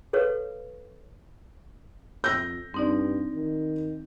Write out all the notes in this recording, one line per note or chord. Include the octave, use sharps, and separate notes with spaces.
A4 B4 C#5 F5
F2 E6 G6 A#6
G2 C4 D#4 D5
D#3